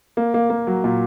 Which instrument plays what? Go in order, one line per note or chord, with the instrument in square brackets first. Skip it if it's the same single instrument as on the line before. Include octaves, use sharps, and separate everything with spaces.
[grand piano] A#3
A#3
A#3
F#3
A#2